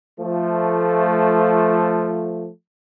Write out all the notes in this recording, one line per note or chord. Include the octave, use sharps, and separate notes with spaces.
F3 A3